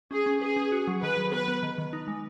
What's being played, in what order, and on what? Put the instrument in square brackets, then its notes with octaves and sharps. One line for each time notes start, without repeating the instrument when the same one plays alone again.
[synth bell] C#4 [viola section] G#4
[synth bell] C#4
[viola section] G#4 [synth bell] B4
[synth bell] C#4
F#4
F#3
[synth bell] D#3 [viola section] B4
[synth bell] F#3
[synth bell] B3 [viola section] B4
[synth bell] B3
D#3
D#3
D#4
G#3